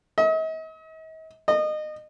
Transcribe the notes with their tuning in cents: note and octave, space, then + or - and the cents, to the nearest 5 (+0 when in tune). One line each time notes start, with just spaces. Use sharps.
D#5 +45
D#5 -25